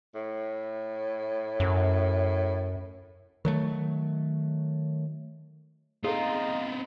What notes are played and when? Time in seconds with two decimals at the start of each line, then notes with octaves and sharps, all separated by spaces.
0.15 A2
1.60 F#2
3.45 D#3 F#3 A3
6.04 B3 C4 D#4 F4 G#4 A4